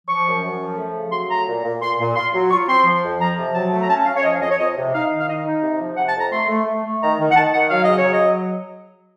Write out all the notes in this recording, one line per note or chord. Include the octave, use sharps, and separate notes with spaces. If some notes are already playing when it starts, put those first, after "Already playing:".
F3 C#6
F#2
F#2
F3
A3
C#3
F#3 C6
A3 A#5
A#2
A#2
A#2 C6
A#2
F4 C6
F#3
F4 C#6
C4 C6
F3
F2
F3 A#5
C3
F#3 A5
A3
A#5
C#4 A5
C#4 F5
C#5
F3 D#5
F5
F2 D#5
C#5
F2 D#5
C3
D#4 F5
D#3
F5
D#4 D#5
D#4
C3
F3
C3 F#5
A5
F2
A#5
A3 C6
A3
A3
A3
D#3 A#5
D#3
F#5
D#3 A5
D#3 F#5
F#3 F5
C#3 D#5
C#5
F#3
D#5
F#3